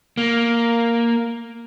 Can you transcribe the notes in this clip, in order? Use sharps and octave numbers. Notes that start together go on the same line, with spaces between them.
A#3